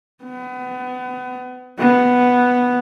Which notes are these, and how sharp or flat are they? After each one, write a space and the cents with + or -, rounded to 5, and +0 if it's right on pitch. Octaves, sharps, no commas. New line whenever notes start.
B3 +30
B3 +0